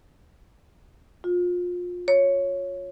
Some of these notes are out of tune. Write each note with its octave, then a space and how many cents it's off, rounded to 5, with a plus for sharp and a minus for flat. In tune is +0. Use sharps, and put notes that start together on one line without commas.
F4 +25
C#5 -5